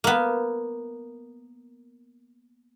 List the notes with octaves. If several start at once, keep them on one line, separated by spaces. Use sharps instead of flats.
A#3 B3